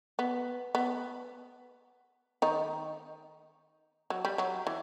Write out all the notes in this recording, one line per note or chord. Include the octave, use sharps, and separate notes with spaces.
B3
B3
D#3 D#4
F#3
G3
F#3
E3